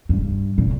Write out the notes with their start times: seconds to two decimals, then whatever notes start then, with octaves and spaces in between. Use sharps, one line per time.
0.09 G2
0.58 A#2